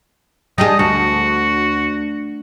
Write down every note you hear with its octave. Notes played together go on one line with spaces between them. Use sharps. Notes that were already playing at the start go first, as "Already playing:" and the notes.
G3 D4 G#4 D#5
D2 F#4